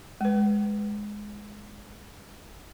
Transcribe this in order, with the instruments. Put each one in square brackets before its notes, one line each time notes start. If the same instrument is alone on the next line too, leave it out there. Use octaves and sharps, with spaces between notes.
[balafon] G#3 B4